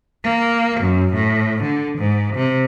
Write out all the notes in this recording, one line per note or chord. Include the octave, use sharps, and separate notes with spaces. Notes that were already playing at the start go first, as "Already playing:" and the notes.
A#3
F#2
A2
D3
G#2
C3